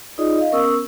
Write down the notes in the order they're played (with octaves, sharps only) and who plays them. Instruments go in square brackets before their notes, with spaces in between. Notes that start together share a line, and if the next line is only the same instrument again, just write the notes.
[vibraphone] D#4 F4 G#4 D5 D#5 D#6
D#5 F5
B3 C#4 A#4 C#6 D#6 E6